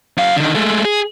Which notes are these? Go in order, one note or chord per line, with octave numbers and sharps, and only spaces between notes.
F#2 F5
D3 D#3
G#3 A3
G#4